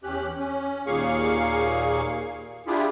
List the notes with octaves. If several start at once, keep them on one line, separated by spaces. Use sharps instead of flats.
E2 C#4 G4 F#6
C#4
D#2 A#2 A#3 G#4 F5 C#6
D4 E4 F4 G4 G#4